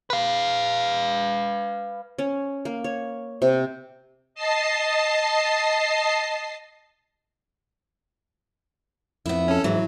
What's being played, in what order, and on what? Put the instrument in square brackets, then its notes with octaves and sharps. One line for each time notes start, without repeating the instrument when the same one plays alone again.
[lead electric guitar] B4 F5
[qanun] C#4
A#3
C#5
C3
[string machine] D#5 A5 C7
[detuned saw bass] F2 [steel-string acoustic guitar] B3 E4
[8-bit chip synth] C#4 A4
[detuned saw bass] G#2 [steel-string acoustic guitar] E3 [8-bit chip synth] F#3